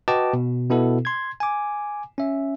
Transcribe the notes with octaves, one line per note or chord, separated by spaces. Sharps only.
F#4 B4 D#5 G5 A5 D6
B2
B2 B3 E4 A4
C6 G#6
G#5 D6
C#4 E5